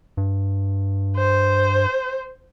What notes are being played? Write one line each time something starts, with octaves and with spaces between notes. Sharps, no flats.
G2
C5